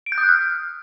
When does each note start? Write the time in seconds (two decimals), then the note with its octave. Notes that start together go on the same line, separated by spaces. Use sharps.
0.06 D7
0.12 G6
0.18 D#6
0.23 F#6
0.29 F6